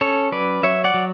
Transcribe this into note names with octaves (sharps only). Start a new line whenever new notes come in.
C#4 A4 C#5
F#3 B4 D5
F#3 C#5 E5
D5 F#5
F#3